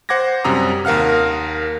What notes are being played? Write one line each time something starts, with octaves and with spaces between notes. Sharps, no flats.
C5 F#5 D6 G#6 A#6
F#2 C3 G3 A#5 D#6
D#2 A#4 F5 F#5 F6